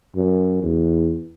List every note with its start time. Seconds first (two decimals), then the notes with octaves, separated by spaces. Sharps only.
0.16 F#2
0.63 E2